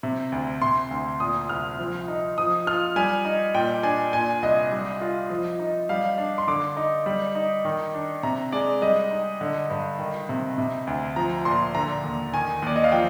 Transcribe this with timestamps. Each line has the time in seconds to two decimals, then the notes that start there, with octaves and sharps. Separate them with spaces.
0.03 C3
0.32 D2
0.62 C3 C6
0.91 D2
1.20 A#2 D#6
1.49 C2 F6
1.79 F3
2.08 D#4
2.38 F3 D#6
2.67 F4 F6
2.96 G3 G#5
3.25 D#4
3.54 A#2 G5
3.83 D4 G#5
4.13 A#2 G#5
4.42 C2 D#5
4.72 G3
5.01 F4
5.30 F3
5.60 D#4
5.89 G3 F5
6.18 D4
6.38 C6
6.47 D3 D6
6.77 D#4
7.06 G3
7.35 D#4
7.65 D#3
7.94 D4
8.23 C3 A#5
8.52 G#3 D5
8.82 G3 D#5
9.11 D#4
9.41 D3
9.70 G2
9.99 D#3
10.29 C3
10.58 C3
10.87 D2
11.16 F3 A#5
11.45 A#2 C6
11.75 D3 A#5
12.04 D#2
12.34 D#3 G#5
12.62 D#2 D5
12.76 D#5
12.84 F5
12.92 F3 G5